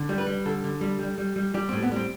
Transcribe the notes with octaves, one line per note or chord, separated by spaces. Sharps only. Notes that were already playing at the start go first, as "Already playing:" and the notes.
Already playing: D3
G3
B4
G3
D3 A4
D3
G3
G3
G3
G3
G3 G4
A2 C4
B3
G3 C4